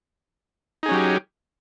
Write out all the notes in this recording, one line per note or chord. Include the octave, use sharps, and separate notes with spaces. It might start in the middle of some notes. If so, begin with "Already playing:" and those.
F#3 C#4 D#4 G4 G#4